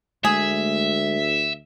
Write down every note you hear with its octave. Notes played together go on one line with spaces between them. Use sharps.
D2 G#3 A3 G#4 E5